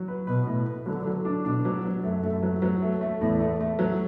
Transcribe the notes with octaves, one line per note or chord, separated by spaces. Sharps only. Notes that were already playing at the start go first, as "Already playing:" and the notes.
Already playing: F#3
B4
B2 B4
A2
B4
D3 F#3
F#3
D4
B2 D4
F#3
F#3
F#2 A3
A3
F#3
F#3
A3
A3
E2 A2
A3
A3
F#3